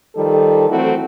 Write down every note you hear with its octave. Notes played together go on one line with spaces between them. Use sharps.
D#3 F3 G3 A4
E3 F#3 A3 C4 E4 F#4